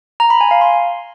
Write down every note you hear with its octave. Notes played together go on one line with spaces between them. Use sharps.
A#5
B5
G#5
F5
C6